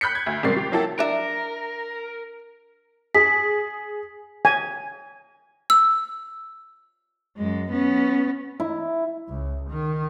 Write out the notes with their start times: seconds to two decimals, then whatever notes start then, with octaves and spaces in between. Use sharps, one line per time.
0.01 B5 F#6 G6 B6 C#7
0.15 G#6
0.26 D2
0.43 G#2 C3 D#3 G3 A6 C7
0.56 G4
0.72 F#3 A#3 E4 A4 G5 A6
0.99 D4 A#4 E5
3.14 G#4 D#6 B6
4.45 G#5
5.70 E6
7.37 F#2 G#3
7.72 B3 C#4
8.60 E4
9.29 C#2
9.70 D#3